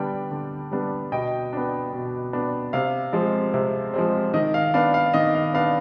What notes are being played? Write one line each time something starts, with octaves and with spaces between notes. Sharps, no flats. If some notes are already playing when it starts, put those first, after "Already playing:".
Already playing: D3 G3 B3 D4 G5
D3
G3 B3 D4
B2 D#5 G5
B3 D4
B2
B3 D4
C3 F5
F3 G#3 C4
C3
F3 G#3 C4
D#3 D#5
F5
B3 D4 F5
F5
D#3 D#5
F5
B3 D4 F5